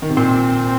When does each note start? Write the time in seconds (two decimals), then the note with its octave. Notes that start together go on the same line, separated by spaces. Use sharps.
0.02 D#3
0.09 C3
0.17 A#2 C4